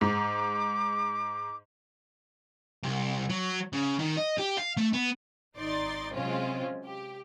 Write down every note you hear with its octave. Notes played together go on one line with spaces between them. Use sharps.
G#2 D6
C2
F#3
C#3
D#3
D#5
G4
F5
A3
B3
G#1 D#4 D5 C6 A6
C3 F#3 G#3 C4 C#4 F4
G4